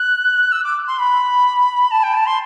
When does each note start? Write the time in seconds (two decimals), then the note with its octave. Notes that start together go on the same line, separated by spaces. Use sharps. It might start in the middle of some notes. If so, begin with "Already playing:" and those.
Already playing: F#6
0.51 E6
0.63 D6
0.87 C6
0.98 B5
1.90 A5
2.03 G5
2.13 A5
2.26 C6